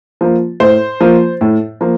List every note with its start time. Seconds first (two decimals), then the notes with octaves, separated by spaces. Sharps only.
0.21 F3 A#3
0.60 A2 C5
1.00 F3 A#3
1.41 A2
1.81 F3 A#3